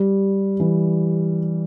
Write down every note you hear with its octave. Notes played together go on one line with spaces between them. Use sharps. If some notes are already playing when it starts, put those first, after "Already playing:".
Already playing: G3
E3